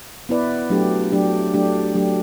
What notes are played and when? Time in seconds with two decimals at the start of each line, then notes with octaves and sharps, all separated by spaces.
0.29 B3 E4 B4 D5
0.70 F#3 A3 D4 G4
1.12 F#3 A3 D4 G4
1.54 F#3 A3 D4 G4
1.95 F#3 A3 D4 G4